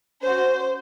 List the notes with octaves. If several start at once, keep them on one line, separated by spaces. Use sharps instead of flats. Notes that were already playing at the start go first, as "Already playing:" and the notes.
C#4 F#4 C5